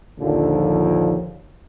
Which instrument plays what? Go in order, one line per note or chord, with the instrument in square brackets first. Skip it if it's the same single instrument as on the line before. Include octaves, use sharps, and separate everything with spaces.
[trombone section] A#1 D#2 D3 F3